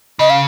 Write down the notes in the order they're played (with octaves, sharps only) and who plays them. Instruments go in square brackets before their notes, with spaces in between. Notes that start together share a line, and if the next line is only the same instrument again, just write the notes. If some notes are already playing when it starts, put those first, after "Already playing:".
[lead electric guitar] C#3 [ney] D#5
[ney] F5